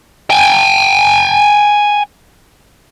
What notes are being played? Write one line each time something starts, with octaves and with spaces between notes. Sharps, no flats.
G5 G#5